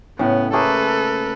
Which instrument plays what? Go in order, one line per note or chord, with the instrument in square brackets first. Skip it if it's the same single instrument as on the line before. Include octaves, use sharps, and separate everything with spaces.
[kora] A2 C#3 [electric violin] B3
[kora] A3 A#3 G#4 [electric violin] A4 B4